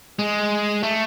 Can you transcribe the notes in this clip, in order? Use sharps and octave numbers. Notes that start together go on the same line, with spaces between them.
G#3
A3